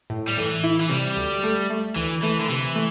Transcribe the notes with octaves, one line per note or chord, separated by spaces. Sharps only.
A2
G3
A2 E3
E4
E3
C3 G3
D2
A3
A3
D2 E3
E3 A3
D3
C3 E3
A3